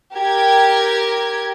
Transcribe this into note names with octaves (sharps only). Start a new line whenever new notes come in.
G4 A#4 G#6